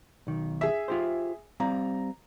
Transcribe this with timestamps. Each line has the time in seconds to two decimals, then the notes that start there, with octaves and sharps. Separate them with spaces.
0.27 B1 D#3
0.61 G#4 E5
0.88 F4 G4 C5
1.60 G3 C4 F5 A#5